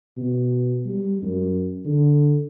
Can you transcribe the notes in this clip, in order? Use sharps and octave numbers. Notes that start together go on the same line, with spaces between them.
B2
G3
F#2
D3